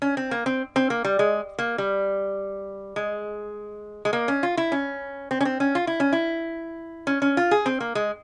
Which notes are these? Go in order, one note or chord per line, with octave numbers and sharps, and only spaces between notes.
C#4
C4
A#3
C4
C4
A#3
G3
G#3
A#3
G3
G#3
G#3
A#3
C#4
F4
E4
C#4
C4
C#4
C4
C#4
F4
E4
C#4
E4
C#4
C#4
F4
G#4
C4
A#3
G#3